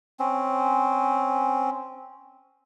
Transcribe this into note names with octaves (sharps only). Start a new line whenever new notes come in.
C4 C#4